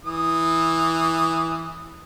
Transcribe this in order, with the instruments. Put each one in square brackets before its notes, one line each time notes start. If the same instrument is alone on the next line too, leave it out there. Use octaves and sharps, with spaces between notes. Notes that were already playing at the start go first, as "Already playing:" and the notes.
[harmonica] E3 D#6